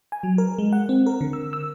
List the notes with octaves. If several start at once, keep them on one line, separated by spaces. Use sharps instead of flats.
G#5
F#3
A#4
G#3
F#5
C4
A#4
D3
E6
E6